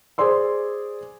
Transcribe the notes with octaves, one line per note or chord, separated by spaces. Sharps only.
G#4 C5 D5 C6 E6